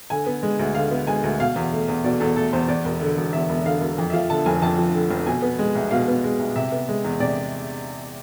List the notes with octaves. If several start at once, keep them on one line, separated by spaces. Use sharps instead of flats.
D3 G#5
B3
G#3
D2
D3 F5
B3
G#3 G#5
D2
B2 F5
E2
A3
E2
B2 D5
E2 A4
A3 A4
E2 C5
E2 D5
E1
D3
E1
E2 E5
E1
D3 F5
E1
F2
E5
F3 F5
D3 A5
F1 G#5
F2 A5
F3
D3
F1
B2 G#5
B3
G#3
C2
B2 F5
B3
G#3
C2
C3 E5
B3
G#3
E2
C3 D5